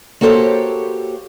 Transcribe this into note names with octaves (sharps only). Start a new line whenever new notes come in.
A#3 F#4 G4 A4 C5 C#5